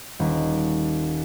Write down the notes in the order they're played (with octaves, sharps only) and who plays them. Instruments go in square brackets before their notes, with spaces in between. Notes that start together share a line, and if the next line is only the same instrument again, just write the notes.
[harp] D#1